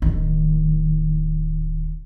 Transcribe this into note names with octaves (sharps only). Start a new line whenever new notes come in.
D1 D#3